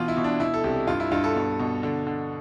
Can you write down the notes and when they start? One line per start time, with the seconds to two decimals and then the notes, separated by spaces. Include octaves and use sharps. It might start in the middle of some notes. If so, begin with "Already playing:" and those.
Already playing: B2 E3 F4
0.08 E4
0.17 B2
0.24 D4
0.40 B2 E4
0.54 A4
0.64 C2 G4
0.87 G2 F4
1.00 E4
1.11 G2 F4
1.24 A4
1.35 B2
1.59 B2
1.83 D3
2.07 D3